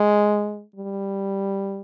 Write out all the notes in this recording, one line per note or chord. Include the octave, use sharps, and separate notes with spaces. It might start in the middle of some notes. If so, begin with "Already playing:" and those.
Already playing: G#3
G3